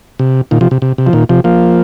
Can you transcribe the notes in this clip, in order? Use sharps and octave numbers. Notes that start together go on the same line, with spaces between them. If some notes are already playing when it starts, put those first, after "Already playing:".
C3
A#2 D#3
C3 F3
C3
C3
C3
F3
A#2 D#3
C3 F3
F3 A#3